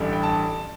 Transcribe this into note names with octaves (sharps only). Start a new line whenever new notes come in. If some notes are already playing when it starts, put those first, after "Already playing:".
Already playing: A1 G2 D3 G3
G5
A5